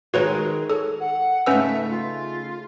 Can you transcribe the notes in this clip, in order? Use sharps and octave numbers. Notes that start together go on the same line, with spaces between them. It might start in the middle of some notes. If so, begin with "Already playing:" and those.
D#3 F#3 G#3 F#4 B4 C#5
A4 C#5
F#5
G#2 C#3 A3 C#4 B4 E5 E6
F4